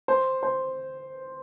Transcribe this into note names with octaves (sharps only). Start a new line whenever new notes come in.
C5
C5